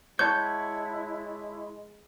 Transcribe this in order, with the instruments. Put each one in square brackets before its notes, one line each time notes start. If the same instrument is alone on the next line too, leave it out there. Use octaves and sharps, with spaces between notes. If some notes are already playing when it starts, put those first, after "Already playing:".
[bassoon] G#3 [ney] E4 [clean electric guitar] C#5 F#5 A5 [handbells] G6